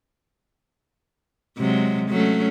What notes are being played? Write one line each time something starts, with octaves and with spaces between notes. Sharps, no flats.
C3 F#3 G#3
F#3 A3 C#4